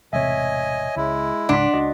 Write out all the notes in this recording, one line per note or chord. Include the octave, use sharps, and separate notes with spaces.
E1 A1 C3 C#5 D#5 E5 G#5
C#2 G#3 E4
C#2 G#2 C#3 D4 F#5 C6 B6
C#2 F#4 D5 D#5